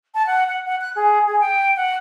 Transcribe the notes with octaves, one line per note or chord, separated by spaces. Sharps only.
A5
F#5
F#5
F#5
F#6
G#4
G#4
G5
F#5